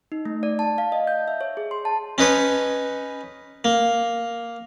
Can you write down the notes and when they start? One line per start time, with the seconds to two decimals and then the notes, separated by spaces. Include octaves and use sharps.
0.12 D#4
0.25 A3
0.43 D5
0.59 A5
0.78 F5
0.92 D#5
1.07 G6
1.28 E5
1.41 C#5
1.57 G#4
1.71 C6
1.85 A5
2.18 C#4 D#4 B4 C#5
3.64 A#3